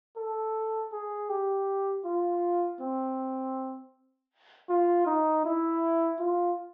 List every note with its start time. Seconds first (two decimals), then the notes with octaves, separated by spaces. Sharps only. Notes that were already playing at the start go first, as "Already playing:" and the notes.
0.17 A4
0.92 G#4
1.29 G4
2.05 F4
2.81 C4
4.69 F4
5.06 D#4
5.45 E4
6.19 F4